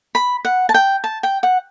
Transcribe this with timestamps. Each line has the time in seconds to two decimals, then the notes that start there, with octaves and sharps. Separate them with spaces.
0.15 B5
0.45 F#5
0.69 A5
0.74 G5
1.04 A5
1.23 G5
1.43 F#5